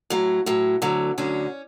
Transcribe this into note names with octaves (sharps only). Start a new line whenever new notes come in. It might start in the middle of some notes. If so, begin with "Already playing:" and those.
A2 F#3
A2 F#3
D2 D3 F#3
D2 D3 F#3 C#4